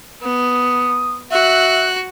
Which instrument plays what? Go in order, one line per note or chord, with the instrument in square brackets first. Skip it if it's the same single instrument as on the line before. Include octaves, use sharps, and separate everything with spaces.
[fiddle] B3 [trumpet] D#6
[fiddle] F#4 F#6 [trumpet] E5